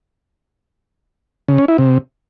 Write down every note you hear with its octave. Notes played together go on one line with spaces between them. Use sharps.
C#3
C#4
E4
C3